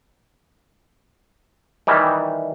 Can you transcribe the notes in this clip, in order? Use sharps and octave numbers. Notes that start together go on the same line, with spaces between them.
D#3 E3 G3